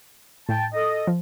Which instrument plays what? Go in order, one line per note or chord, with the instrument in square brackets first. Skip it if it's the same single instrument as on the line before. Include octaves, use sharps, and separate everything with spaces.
[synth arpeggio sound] A2 [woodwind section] G5 A5
[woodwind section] A4 D#5
[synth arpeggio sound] F3